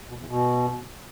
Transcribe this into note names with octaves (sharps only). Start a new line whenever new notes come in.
B2
E2
B2